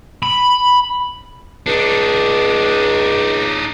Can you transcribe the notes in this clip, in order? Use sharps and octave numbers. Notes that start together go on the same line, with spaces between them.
B5
C#2 D4 D#4